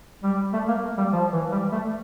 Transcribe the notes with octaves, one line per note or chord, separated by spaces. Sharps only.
G3
A3
A#3
G3
F3
E3
G3
A3